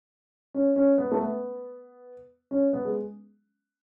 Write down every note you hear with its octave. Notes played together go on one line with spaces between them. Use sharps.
C#4
C#4
B3
A3
B3
C#4
B3
G#3